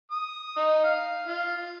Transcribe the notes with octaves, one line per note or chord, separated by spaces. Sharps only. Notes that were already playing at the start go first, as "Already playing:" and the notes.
D#6
D#4
F5
F4